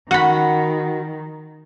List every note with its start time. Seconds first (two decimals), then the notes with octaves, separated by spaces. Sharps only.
0.11 D#3 F#4 F#5 B5